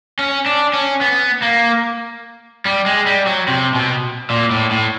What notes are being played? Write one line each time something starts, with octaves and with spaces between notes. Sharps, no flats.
C#4
D4
C#4
B3
A#3
G3
G#3
G3
F#3
C3
B2
A#2
A2
A2